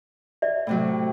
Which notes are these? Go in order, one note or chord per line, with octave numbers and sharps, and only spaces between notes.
D5 E5
A2 C3 F#3